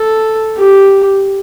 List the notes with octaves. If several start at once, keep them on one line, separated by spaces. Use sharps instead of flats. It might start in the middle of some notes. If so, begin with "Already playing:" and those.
Already playing: A4
G4